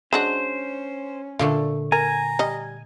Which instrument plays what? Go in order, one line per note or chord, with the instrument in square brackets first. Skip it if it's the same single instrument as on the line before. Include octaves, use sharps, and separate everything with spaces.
[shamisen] G#3 D4 F#4 [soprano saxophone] C#4 [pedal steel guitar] C5
[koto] A#2 D3 A3 [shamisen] F4
[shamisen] A#4 [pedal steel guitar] G#5 [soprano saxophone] A#5
[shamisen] G3 D#5